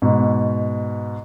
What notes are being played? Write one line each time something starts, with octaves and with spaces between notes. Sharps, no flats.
G#2 B2